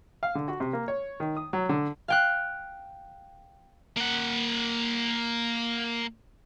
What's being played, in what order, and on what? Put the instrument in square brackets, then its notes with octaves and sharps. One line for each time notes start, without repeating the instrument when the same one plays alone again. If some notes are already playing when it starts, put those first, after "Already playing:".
[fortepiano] F5
D3
F#4
C3
A#3
C#5
D#3
D#6
F#3
D3
[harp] F5 G5 F#6
[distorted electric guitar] A#3 F#5